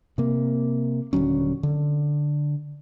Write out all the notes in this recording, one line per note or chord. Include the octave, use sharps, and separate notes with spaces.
C3 A#3
D#1 D3 F#3 C#4
D3